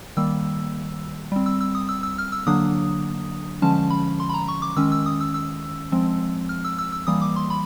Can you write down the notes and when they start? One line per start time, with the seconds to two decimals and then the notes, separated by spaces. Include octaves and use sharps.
0.17 D#3 G3 A#3 E6
1.32 G3 C4
1.46 E6
1.61 E6
1.75 D#6
1.89 E6
2.03 E6
2.18 F6
2.32 E6
2.47 D3 F#3 A#3 D4 D#6
3.62 D3 F3 G#3 C#4 A5
3.90 B5
4.20 C6
4.29 B5
4.34 A#5
4.48 C#6
4.62 D6
4.77 D#3 G#3 C#4 E6
4.92 E6
5.06 D#6
5.21 E6
5.34 E6
5.92 F3 G#3 C4
6.49 F6
6.65 E6
6.78 E6
6.92 E6
7.07 E3 G3 A#3 D#6
7.22 D6
7.36 C6
7.50 B5